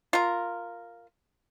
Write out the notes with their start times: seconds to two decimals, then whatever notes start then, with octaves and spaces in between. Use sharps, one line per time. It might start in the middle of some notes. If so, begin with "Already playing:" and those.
0.13 F4 A#4